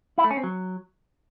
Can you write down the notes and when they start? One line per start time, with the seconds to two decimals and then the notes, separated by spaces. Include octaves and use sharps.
0.18 E4
0.24 A3
0.31 C#4
0.37 C4
0.44 F#3